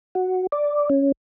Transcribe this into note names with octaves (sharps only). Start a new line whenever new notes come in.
F#4
D5
C#4